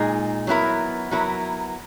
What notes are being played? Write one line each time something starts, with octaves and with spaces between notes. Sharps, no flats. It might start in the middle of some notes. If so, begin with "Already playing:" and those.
Already playing: A#2 G#3 D#4 G#4
F#3 B3 E4 A#4
F#3 B3 E4 A#4